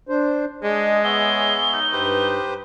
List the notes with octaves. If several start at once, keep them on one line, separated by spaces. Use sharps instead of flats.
D4 C5
G#3 D4 G#4 D#5
B3 G#4 C#5 E5 G7
D#4
G2 G4 B4 C5